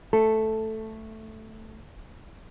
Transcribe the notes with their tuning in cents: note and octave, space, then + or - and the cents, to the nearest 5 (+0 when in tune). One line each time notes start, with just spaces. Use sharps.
A3 +0 A4 +0